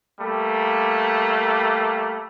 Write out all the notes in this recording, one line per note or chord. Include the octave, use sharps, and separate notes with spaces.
G3 A3 A#3